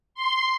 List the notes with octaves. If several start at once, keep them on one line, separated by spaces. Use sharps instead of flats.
C6